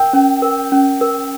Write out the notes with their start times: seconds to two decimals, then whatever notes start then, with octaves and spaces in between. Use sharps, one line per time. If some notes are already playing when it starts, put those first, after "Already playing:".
Already playing: A#4 G5
0.13 C#4
0.42 A#4
0.72 C#4
1.01 A#4